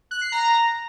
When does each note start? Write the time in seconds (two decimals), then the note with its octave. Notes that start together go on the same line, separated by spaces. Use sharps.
0.11 F#6
0.21 C7
0.32 A#5